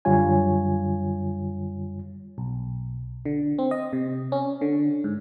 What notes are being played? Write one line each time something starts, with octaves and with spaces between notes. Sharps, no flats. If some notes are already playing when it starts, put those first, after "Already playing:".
F#2 D3 G3 F4 C#5 G#5
B1
D3
C4
D#5
C3
C#4
D3
G#2